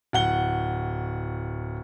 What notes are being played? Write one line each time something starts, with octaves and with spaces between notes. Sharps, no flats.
D1 F#5 G7